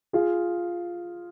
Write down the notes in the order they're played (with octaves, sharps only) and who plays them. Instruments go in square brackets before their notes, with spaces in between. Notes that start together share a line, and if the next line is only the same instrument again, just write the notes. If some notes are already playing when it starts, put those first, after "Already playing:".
[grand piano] F4 G#4